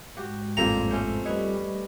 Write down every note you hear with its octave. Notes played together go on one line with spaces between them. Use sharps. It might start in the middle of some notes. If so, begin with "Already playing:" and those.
G#2 F#4 G4
A1 F2 A2 G3 A#3 C5 A#5
A3 C#4 C5
G3 A3 B4 C#5 D#5